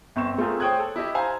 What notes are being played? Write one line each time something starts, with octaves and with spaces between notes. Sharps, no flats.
G1 C4 C#6 E7
A3 C4 F4 G#4 A#4
C5 C#5 G5 D#6 F#6 G#6
A4
E4 G4 D#5
C5 F5 G#5 A#5